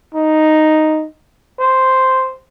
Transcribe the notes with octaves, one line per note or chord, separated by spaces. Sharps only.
D#4
C5